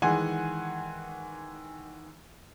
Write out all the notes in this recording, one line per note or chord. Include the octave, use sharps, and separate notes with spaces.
D#3 E3 G#3 F#5 G#5 C6